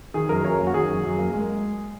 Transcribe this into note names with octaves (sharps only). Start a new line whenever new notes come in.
D#3 G#4
F#2 A#4
F#2 C#5
A#3
F#4
D#3 G#4
F#2
F#2
A#3
G#3